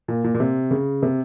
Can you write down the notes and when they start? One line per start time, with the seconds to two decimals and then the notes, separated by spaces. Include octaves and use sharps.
0.08 A#2
0.24 A#2
0.34 A#2
0.40 C3
0.71 C#3
1.03 C3